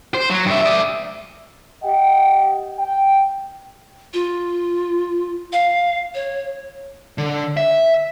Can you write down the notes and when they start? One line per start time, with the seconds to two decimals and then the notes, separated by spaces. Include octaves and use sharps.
0.14 C5
0.30 F#3
0.46 G2 E5
0.61 D5 E5
1.83 G4 D#5 F#5 G5
2.79 G5
4.14 F4
5.53 F5
6.15 C#5
7.18 D3
7.57 E5